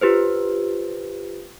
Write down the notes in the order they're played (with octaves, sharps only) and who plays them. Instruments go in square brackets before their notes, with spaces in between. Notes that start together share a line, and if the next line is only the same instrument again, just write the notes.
[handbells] F4 G4 B4 C5